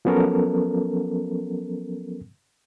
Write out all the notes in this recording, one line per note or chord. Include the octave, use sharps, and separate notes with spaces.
F3 F#3 B3 C#4 A4 A#4